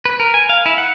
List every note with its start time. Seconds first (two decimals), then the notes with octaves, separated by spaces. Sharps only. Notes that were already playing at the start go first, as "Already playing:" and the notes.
0.05 B4
0.20 A#4
0.34 G#5
0.49 F5
0.66 E4
0.78 F#5